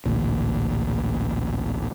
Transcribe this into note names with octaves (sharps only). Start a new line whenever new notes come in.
A1 D2 A#2